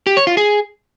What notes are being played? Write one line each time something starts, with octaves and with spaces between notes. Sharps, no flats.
G4
C#5
F4
G#4